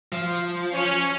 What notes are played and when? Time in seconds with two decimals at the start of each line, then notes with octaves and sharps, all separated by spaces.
0.12 F3
0.73 C#4